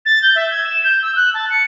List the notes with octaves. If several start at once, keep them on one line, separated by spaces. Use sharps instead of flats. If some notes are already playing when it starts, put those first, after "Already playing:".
A6
G6
E5
G#6
E7
G6
E6
F#6
A5
C#7